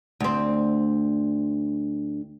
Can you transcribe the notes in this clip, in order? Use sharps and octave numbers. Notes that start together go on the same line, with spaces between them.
D2 C4